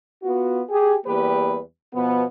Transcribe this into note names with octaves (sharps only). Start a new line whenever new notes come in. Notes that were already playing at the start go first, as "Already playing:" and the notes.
B3 F4 F#4
G4 G#4
E2 G3 A#3 G4 B4
B2 F3 B3